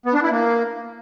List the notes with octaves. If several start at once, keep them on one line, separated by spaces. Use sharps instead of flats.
B3
D4
E4
A#3